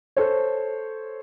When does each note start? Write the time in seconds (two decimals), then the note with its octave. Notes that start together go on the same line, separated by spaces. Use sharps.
0.17 A4 C5 C#5